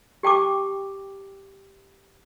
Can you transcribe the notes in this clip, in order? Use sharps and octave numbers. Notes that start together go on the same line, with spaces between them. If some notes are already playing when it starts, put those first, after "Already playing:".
G4 G5 A5 D6